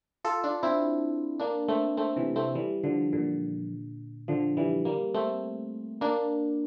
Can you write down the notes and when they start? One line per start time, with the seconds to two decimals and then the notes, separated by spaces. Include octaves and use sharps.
0.24 F4 A4
0.43 D4 F4
0.63 C4 E4
1.39 A#3 D4
1.68 A3 C4
1.97 A3 C4
2.16 C3 E3
2.36 A3 C4
2.55 E3 G3
2.84 D3 F3
3.13 A#2 D3
4.28 D3 F3
4.57 E3 G3
4.85 G3 A#3
5.14 A3 C4
6.01 A#3 D4